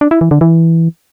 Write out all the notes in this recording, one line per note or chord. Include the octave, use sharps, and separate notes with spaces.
D4
E4
E3
D3
E3